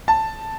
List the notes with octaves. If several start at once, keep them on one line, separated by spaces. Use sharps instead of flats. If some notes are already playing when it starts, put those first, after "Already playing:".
A5